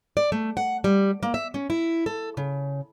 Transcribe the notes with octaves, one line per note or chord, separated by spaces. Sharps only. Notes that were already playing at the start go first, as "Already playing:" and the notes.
D5
A3
F#5
G3
A#3
E5
C#4
E4
A4
C#3